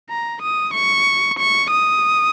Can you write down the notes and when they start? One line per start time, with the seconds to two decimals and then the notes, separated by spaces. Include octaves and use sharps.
0.10 A#5
0.42 D#6
0.74 C#6
1.39 C#6
1.71 D#6